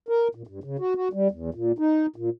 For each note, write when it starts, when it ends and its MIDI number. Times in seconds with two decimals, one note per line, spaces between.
0.09 0.28 70
0.35 0.43 46
0.47 0.59 43
0.64 0.77 49
0.79 0.94 66
0.95 1.08 66
1.13 1.28 55
1.31 1.50 40
1.54 1.72 46
1.79 2.06 63
2.16 2.30 46